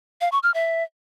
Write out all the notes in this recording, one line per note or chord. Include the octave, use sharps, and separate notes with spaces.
F5
C#6
F6
E5